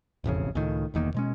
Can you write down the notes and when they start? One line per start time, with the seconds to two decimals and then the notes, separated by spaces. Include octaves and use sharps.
0.24 E1 A1 F2 C#3
0.55 C#2 A2 D#3
0.94 E1 E2 D#3 A#3
1.15 B2 G#3 C#4